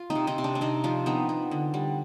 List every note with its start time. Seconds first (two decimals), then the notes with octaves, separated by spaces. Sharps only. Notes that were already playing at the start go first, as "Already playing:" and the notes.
Already playing: F4
0.10 C4 D#4
0.15 C3
0.27 C4 D#4
0.38 C3
0.44 D4
0.55 D4
0.61 C3 C4 D#4
0.84 F3 D4 F4
1.06 B3 C4 D#4
1.29 B3
1.51 D3
1.74 G3